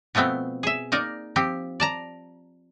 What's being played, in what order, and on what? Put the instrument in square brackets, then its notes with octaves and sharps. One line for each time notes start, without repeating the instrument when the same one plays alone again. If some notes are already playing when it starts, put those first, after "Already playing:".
[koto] B2 F3 A3 B3 C4
G#4 E5
A#3 D#4 A#4 D5
F3 C4 G4
D5 A5 A#5